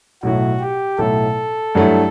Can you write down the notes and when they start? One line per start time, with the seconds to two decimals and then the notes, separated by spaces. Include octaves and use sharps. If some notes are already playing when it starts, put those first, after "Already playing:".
0.23 B1 A2 F#3 A3 E4 F#4
0.60 G4
0.98 B1 A2 F#3 A3 E4 A4
1.75 G2 F#3 A3 E4